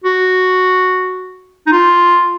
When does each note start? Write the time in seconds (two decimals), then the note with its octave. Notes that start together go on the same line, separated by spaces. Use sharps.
0.04 F#4
1.67 D#4
1.72 F4